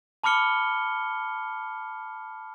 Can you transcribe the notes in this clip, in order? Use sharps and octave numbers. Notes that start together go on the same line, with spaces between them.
A5 B5 D6 F6 C#7 G7